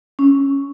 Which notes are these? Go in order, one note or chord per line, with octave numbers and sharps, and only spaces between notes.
C#4